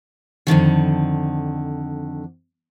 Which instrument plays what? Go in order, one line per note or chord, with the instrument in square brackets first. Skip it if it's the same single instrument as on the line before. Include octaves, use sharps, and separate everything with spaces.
[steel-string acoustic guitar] F2 B2 D3 D#3